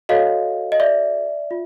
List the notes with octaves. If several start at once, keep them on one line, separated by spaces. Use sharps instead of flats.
F#4 A4 C#5 D#5 F5
D#5
D5 E5
F4